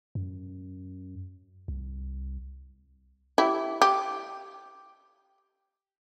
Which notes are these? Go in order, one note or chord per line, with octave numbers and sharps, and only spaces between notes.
F#2
C2
E4 G4
G4